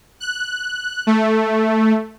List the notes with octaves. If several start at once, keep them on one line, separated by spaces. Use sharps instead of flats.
F#6
A3